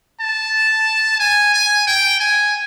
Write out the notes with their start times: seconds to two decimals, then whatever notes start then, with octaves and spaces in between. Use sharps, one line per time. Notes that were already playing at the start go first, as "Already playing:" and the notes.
0.20 A5
1.20 G#5
1.54 G#5
1.87 G5
2.20 G#5